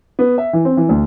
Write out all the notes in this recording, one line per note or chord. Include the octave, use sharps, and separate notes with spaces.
B3
E5
E3
C4
E3
D2